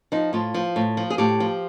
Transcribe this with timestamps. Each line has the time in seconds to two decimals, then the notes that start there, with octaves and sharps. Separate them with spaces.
0.12 F3 D#4
0.33 A2 F4
0.54 F3
0.76 A2
0.97 F3
1.10 G#4
1.18 A2 G4
1.40 F3